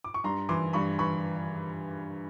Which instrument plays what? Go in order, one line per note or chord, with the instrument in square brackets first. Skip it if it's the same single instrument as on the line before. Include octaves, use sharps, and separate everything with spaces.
[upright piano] D6
C#6
G2 A#5 C6
E3 C6 D6
G2 B5 C#6
E3 B5 C#6